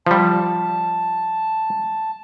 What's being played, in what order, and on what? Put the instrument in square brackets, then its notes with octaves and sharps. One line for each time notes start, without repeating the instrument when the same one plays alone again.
[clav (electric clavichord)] F3 G3 [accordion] A5